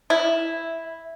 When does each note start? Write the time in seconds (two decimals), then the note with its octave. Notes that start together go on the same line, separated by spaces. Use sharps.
0.10 E4